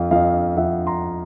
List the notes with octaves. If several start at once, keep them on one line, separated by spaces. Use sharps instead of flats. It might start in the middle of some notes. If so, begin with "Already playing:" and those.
Already playing: F2 F5
F2 D#5 F5
F2 E5 F#5
A#5 C6